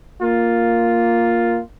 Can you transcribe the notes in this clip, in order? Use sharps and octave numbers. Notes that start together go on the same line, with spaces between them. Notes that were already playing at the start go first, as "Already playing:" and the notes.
A#3 F4